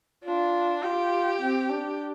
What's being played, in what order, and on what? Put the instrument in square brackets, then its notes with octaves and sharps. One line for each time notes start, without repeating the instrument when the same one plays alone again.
[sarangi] D4 [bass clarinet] F4
[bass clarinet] F4 [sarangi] G4
[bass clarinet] C4
D4